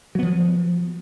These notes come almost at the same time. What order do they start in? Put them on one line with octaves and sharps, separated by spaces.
F#3 B3 F3